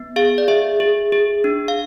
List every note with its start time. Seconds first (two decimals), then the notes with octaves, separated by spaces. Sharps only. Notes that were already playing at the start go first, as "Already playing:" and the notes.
Already playing: B3
0.16 G#4 F5
0.38 D5
0.48 G#4 E5
0.80 G#4
1.12 G#4
1.44 D4
1.68 F5